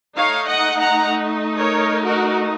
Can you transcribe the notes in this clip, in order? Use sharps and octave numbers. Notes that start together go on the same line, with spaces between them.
A3 D#4 C#5 F5
D#5 F#5
F#5 A#5
A#4 C#5
F#4 A#4